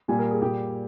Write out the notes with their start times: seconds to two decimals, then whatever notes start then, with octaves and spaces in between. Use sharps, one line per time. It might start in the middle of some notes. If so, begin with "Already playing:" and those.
0.08 A#2 G3 G#5
0.19 A#4
0.31 G#4
0.41 A#2 G3 G4